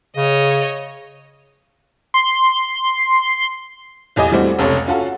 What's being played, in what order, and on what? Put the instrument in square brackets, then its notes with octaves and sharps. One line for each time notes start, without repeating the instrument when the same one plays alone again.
[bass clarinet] C#3 [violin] C#5 D#5
[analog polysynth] C6
[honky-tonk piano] B1 E2 G4 D#5 G#5
E3 G3 A3 C4 F#4
F1 C#2 A4 C#5
C#4 F4 F#4 A4